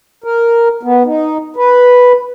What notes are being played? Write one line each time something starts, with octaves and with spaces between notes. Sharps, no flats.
A#4
B3
D#4
B4